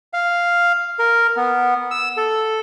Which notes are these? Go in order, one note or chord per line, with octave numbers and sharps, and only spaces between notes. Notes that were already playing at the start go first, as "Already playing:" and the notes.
F5
A#4
B3
E6
A4